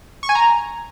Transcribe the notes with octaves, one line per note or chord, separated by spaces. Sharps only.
C#6
G#5
A#5